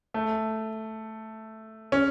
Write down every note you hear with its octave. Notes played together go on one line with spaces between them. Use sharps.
A3
C#4